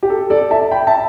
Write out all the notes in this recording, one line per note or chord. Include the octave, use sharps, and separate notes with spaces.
G4
A4
A4 D5
E5 A5
G5 B5
E5 A5